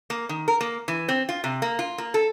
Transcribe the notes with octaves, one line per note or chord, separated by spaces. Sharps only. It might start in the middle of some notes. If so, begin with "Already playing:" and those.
A#3
D#3
A#4
A#3
E3
C4
F4
C3
A#3
F4
A#3
A4